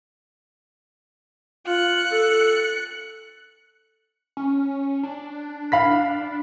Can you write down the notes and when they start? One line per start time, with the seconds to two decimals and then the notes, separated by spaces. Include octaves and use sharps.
1.67 F4 F#6 C#7
2.12 A4
4.37 C#4
5.03 D4
5.72 F5 B5 B6